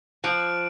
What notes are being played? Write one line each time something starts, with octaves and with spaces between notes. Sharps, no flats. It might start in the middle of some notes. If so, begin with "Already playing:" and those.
F3 D6 F#6 D7 F#7